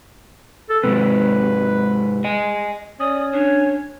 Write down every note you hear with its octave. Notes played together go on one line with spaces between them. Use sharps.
A4
G#2 C3 B4
D#5 G#5
C#4 D5 D#6
D4 C#5